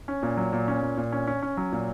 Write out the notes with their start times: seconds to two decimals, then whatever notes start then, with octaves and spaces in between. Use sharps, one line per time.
0.08 C#4
0.23 A#2
0.37 F#3
0.53 A#2
0.68 C#4
0.83 A#2
0.97 A#2
1.12 C#4
1.27 C#4
1.42 C#4
1.57 F#3
1.72 A#2